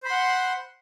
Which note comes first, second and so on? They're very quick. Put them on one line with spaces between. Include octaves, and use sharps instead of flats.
C5 B5 C6 F#5